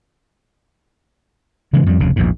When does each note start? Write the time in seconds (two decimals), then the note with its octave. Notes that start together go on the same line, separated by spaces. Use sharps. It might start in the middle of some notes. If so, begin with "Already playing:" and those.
1.73 C#3 E3 F3 G#3
1.87 F2 G3
2.00 F1 D2 C#3
2.16 A#1 E2 G#2